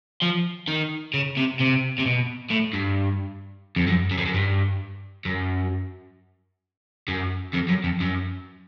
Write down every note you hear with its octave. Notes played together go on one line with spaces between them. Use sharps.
F3
D#3
C#3
C3
C3
C3
B2
A2
G2
F2
F#2
F#2
F2
F#2
G2
F#2
F#2
F2
F#2
F2
F#2